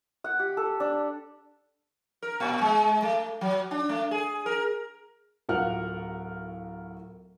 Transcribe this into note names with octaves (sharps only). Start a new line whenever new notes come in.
F#5
G4
A4
D4
A#4
A#2
G#3
A3
F#3
D4
A3
G#4
A#4
D1 A2 F4 A#4 F#5 F6